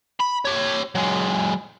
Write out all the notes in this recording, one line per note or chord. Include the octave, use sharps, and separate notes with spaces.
B5
G4 C#5
F#3 G#3